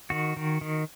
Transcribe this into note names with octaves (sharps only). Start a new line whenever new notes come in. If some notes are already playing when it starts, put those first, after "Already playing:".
D#3 F#4
D#3
D#3